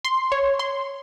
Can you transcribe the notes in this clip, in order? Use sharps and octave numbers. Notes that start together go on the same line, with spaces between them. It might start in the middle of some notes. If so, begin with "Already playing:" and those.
C6
C#5
C6